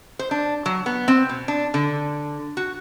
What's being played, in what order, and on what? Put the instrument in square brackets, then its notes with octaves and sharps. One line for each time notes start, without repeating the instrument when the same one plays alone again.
[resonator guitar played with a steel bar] C5
D4
F#3
B3
C4
B2
D4
D3
F#4